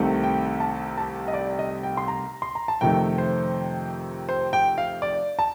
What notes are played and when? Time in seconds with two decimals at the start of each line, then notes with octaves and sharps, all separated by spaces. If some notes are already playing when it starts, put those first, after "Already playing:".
Already playing: C2 C3 D#3 A3
0.24 G5
0.60 A5
0.97 A5
1.28 D#5
1.34 D5
1.59 D#5
1.83 G5
1.97 C6
2.08 A#5
2.42 C6
2.55 A#5
2.68 A5
2.81 F2 C3 D#3 A3 G5
3.18 C5
4.29 C5
4.53 G5
4.78 F5
5.02 D5
5.39 A5